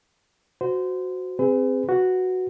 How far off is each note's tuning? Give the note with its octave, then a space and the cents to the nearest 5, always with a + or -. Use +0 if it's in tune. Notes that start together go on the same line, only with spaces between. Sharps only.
F#4 -5 C5 -25
C4 +0 G#4 -20 B4 +40
F#4 +0 B4 +0